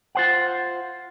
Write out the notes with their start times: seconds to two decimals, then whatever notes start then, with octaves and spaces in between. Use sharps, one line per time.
0.15 F4 C5 F#5